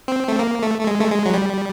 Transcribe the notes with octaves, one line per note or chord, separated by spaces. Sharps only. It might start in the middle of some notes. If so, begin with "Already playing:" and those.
C4
A3
A#3
A3
A3
G#3
A3
G#3
F#3
G3